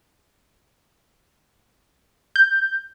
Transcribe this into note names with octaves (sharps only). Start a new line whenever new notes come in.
G6